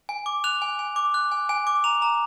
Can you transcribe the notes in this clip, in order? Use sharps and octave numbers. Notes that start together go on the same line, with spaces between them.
G#5
D6
F#6 F7
G#5
G#5
D6
F#6
G#5
G#5
D6
A#5 F7
A#5